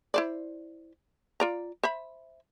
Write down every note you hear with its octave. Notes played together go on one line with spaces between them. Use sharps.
E4 C5 D5
F4 D5 A#5
C5 E5 B5